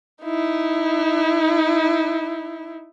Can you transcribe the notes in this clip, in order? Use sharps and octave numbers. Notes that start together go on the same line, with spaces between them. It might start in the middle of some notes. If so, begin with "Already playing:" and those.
D#4 E4